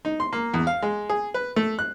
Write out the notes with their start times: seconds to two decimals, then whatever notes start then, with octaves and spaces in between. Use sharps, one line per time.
0.05 D#4
0.20 C6
0.33 A#3
0.54 E2
0.67 F5
0.82 G#3
1.09 G#4
1.34 B4
1.56 A3
1.79 F#6